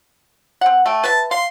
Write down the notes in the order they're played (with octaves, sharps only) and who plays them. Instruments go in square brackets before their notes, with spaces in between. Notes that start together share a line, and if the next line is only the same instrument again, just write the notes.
[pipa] C4 F#5
A3 G5
[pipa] B4 E5 [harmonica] A5
[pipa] F5 [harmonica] C6